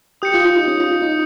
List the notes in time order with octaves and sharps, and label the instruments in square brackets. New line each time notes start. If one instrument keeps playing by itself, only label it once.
[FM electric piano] G4 [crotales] D#6 G6 C#7
[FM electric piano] F4
F4
D#4
C#4
F4
F4
D#4